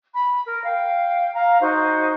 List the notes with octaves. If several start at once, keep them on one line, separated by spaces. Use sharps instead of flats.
B5
A#4
F5 G5
F5 A#5
D#4 F#4 C5